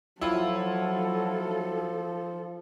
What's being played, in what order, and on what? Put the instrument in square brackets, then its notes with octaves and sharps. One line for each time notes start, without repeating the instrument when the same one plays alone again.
[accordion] F3 [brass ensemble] F#3 [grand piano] E4 F4 [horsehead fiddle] A4